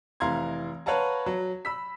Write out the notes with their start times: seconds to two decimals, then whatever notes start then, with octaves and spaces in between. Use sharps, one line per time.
0.20 F1 E3 F5 A#5 C6 G#6
0.86 B4 C#5 F5 F#5 A5 A#5
1.26 F#3
1.65 B5 E6 B6